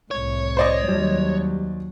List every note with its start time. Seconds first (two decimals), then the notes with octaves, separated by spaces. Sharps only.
0.11 C2 A2 C#5
0.57 C5 D5 D#5
0.88 D#2 F#3 G3